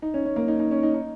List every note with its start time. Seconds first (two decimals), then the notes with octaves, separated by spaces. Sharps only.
0.02 D#4
0.14 C#4
0.25 C#4
0.36 A#3
0.48 D#4
0.60 D#4
0.71 C#4
0.83 D#4
0.94 D#4